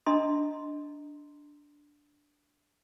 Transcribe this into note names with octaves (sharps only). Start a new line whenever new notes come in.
D4 D#5 A#5 C6